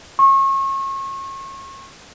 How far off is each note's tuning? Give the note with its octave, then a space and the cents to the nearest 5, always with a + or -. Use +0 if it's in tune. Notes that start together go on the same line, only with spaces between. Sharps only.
C#6 -35